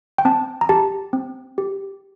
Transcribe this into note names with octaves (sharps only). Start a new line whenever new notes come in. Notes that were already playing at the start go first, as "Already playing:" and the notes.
G5
C4 A5
A#5
G4 A5
C4
G4